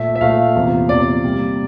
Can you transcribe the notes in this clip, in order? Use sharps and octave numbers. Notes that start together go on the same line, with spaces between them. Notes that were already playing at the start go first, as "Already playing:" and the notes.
Already playing: A#2 A3 E5
E5
A#2 A3 F5
E2 C3 F3 A#3
E2 C3 F3 A#3 D5
C3 G3 A#3